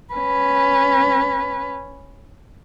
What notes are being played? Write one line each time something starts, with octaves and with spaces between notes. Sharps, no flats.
C#4 B4